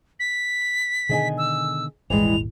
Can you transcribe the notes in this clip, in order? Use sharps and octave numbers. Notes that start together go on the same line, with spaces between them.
B6
B2 D3 D#3 G#4 D#5 G#5
E6
D#1 G#1 D#2 E3 G3 G#3 F7